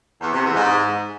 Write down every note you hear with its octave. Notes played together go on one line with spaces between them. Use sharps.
E2
C3
E2
G#2